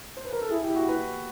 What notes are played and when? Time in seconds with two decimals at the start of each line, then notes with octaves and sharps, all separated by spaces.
0.17 C5
0.25 B4
0.33 A#4
0.42 A4
0.50 E4 G#4
0.63 G4
0.76 F#4
0.89 B4